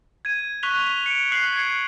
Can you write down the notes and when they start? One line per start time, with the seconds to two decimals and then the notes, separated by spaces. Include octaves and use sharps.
0.25 G#6 D#7
0.63 C#6 F#6 B6 F7 G7
1.06 C#7 D7
1.32 F#6 C7 F#7
1.52 G#6 C#7